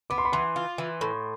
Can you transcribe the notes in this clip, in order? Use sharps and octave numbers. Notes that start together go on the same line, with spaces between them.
B3 D6
C6
B5
E3 C6
F4
E3
A2